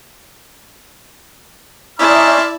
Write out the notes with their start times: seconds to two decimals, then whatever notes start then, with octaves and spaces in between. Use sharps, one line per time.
1.99 C#4 D#4 E4 D5 E5 A5 C6 F6